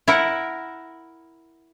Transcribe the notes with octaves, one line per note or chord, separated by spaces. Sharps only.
E4 A#4 E5 F#5